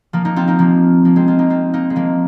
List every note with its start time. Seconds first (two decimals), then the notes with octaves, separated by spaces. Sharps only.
0.13 F3 A#3
0.25 A#3 D#4
0.36 C4 F4
0.47 A#3 D#4
0.59 F3 A#3
1.05 F3 A#3
1.16 G#3 C4
1.28 C4 F4
1.39 A#3 D#4
1.50 C4 F4
1.73 A#3 D#4
1.90 G#3
1.96 F3 A#3